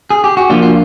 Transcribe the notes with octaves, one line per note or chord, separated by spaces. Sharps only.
G#4
G4
F#4
F3 A#3 D4 F4
F4